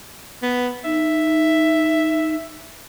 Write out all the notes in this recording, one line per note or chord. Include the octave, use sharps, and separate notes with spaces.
B3
D#4 E5